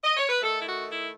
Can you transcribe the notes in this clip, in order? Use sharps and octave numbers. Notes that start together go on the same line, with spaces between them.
D#5
C#5
B4
D#3 A3 A4
E4
F#4
E4